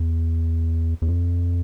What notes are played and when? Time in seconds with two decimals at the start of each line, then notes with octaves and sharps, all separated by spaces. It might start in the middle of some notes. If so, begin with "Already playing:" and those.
Already playing: E2
1.02 E2
1.08 F2